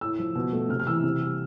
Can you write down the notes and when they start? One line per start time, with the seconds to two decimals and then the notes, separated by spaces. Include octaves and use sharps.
0.01 A2 E6
0.18 F3
0.35 B2
0.53 A3
0.69 C3 F6
0.80 F6
0.86 E3 E6
1.03 C3
1.21 G3